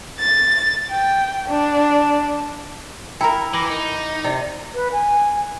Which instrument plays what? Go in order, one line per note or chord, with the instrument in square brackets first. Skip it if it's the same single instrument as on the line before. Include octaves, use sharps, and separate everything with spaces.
[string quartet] A6
G5
D4
[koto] E4 A#4 [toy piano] G5 A#5
[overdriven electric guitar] E3 [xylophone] B5 D6 A#6
[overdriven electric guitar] D#4
[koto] C3 [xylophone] D5
[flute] B4
G#5